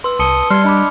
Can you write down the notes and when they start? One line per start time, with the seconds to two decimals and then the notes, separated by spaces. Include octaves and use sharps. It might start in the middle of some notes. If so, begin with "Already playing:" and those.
0.04 B4 C6 E6
0.19 C2 A5 D#6 C#7 G7
0.51 G3 D5 C6 F6 G#6
0.64 D4 D#5 B5 D6